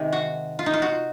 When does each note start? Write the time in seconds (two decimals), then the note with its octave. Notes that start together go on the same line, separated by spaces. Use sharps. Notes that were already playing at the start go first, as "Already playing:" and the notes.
Already playing: C3 D#3 G#3
0.13 F#4
0.59 F4
0.66 D#4
0.73 F4
0.82 F#4